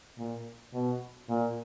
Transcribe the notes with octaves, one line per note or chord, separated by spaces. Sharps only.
A#2
B2
A#2